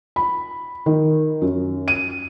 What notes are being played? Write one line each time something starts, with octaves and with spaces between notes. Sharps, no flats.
B5
D#3
F#2
D#7